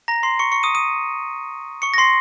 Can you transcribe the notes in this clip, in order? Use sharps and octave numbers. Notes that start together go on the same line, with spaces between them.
A#5 A#6
C6 C7
C#6 C#7
C#6 C#7
D#6 D#7
D#6 D#7
C#6 C#7
A#6
C6 C7